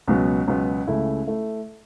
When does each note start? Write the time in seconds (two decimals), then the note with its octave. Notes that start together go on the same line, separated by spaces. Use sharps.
0.07 C#2 B2 F#3 B3
0.48 C#2 B2 F#3 B3
0.87 C#2 C#3 A3 E4
1.27 A3 E4